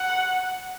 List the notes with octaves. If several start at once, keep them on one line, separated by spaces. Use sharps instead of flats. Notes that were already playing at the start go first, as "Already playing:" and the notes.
Already playing: F#5